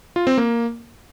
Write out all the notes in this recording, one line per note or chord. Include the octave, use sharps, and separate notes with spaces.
F4
C4
A#3